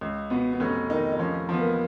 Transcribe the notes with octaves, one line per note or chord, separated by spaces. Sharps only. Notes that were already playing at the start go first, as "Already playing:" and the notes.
C#2
B2 B3
B3
F1 C#4
D#3 D#4
D#4
F3 C#4
F3 B3
A#3